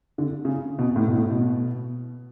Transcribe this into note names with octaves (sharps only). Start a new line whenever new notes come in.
D3
C#3
B2
A2
B2
A2
B2